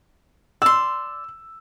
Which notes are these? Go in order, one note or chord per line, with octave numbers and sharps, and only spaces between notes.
D5 C6 E6